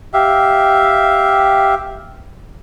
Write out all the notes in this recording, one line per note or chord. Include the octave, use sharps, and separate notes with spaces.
G4 E5 F5